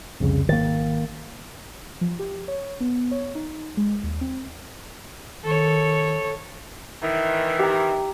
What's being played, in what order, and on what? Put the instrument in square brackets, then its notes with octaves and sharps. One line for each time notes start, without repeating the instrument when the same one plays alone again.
[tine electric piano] C2 F2 C#3
[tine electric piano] G#1 A6 [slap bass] D#3 A#3
[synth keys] F3
G4
C#5
B3
C#5
D#4
G#3
D#2
C4
[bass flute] D#3 [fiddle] A4 C#5
[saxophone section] D#3 E3
[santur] G4 A#5